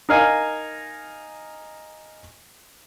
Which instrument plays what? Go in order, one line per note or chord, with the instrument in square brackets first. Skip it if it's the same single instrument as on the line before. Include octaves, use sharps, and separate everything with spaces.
[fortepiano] D#4 A#4 F5 G#5